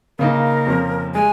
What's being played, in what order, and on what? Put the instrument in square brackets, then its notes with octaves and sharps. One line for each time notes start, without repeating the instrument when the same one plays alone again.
[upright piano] C#3 A#3 D#4 [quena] A#4
[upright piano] F2 F3 C#4
[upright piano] G#3 [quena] G#5